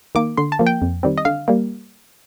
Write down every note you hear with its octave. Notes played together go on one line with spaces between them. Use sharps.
D#3 A#3 D6
D3 C6
A5
F3 A#3
G5
F2
D#3 G3 C4
D#5
D3 F5
G3 A#3